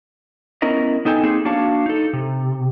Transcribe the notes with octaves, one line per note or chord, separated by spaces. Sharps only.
B3 C#4 E4 A#4 D#5
B3 D#4 A4 G5 G#5
A#3 C4 D#4 G#4
A#3 D4 F#4 C#5 F5 A5
D#4 A4
C3